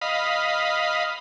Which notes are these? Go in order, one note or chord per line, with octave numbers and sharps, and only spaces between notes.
D#5 F5 B5